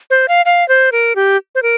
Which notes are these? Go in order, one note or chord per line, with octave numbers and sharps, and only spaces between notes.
C5
F5
F5
C5
A#4
G4
C5
A#4